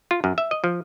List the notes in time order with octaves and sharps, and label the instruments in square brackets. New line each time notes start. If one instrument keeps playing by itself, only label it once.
[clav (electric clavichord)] F4
F#2
E5
D#5
F3